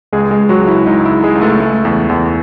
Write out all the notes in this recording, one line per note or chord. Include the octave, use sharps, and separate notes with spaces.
C#2 G#3 G#4
G#3 G#4
C#2
F#3 F#4
C#2
E4
C#2 D#4
E4
G#3
G#3 G#4
C#2
A3 A4
A3
E2
E2